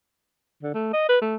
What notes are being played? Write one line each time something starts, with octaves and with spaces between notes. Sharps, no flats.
D3
A3
D#5
B4
A3